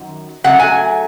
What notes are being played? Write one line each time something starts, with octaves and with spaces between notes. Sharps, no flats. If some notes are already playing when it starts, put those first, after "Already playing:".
Already playing: F#2 D#3
C#3 F#3 A3 F#5
G#5